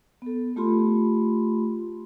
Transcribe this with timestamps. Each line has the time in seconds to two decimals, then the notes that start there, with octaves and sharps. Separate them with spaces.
0.22 B3 A4
0.56 A3 F4 G4 B5 C6